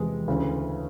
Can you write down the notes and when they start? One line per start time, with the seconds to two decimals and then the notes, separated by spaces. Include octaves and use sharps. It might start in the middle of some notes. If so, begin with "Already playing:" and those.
Already playing: E2 C3 F3 G#3
0.28 D2 C#3 E3